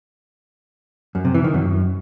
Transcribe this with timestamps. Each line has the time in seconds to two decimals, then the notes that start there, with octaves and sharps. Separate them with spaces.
1.15 F#2
1.25 C3
1.34 E3
1.44 D#3
1.54 F#2